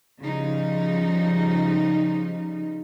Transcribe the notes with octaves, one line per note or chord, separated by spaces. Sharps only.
C#3 F3 G3 D#4